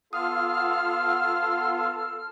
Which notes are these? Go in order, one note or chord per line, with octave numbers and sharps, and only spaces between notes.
B3 F4 A4 F5 D#6 F6